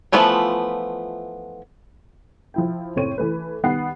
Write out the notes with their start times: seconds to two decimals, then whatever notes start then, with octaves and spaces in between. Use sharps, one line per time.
0.12 E3 F3 A3 B3 F4
2.54 F3 E4 G5
2.96 F#1 A2 C4 C#5 D#7
3.18 E3 A3 B4
3.63 D#3 G3 B3 F#5 C7